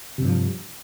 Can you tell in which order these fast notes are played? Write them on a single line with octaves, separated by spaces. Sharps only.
C3 G2 F3